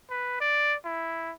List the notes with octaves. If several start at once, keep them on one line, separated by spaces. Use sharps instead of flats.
B4
D5
E4